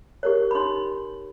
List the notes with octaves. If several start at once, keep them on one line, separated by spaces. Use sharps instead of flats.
G4 A#4 C#5
B5
D#4 C6